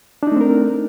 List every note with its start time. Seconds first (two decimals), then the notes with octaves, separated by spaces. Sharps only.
0.23 D4
0.27 D#4
0.32 A3
0.36 C4
0.41 A#4